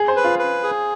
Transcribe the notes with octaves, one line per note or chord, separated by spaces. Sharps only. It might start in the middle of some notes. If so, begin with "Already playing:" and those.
Already playing: G#4
C5
B4
F4
B4
G#4